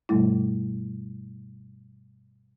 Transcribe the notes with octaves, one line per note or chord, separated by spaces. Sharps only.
G2 B2 G3 A3 E4